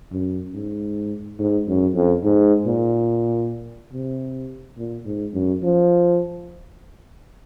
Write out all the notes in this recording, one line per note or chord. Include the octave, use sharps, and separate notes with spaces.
F#2
G#2
G#2
F#2
F2
G#2
A#2
C3
A#2
G#2
F#2
F3